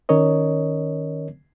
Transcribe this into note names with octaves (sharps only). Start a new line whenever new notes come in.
D#3 C#4 A#4 C#5 D#5